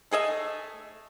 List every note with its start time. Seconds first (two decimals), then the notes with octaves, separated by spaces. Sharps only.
0.11 A3 G#4 D#5 E5